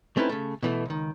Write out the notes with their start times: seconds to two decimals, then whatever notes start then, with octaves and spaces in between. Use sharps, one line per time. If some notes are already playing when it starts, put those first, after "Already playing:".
0.17 A3 C4 C#4 D#4 E4 B4
0.29 C#3 A3
0.63 B2 E3 A3
0.86 C#2 D#3